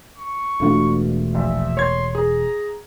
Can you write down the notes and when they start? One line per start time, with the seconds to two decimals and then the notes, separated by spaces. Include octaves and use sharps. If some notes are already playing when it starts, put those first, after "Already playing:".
0.18 C#6
0.60 E1 A3 D4 F4 F#4
1.35 A#1 E5
1.77 C#5 C6 G#6
2.15 G#4 A#5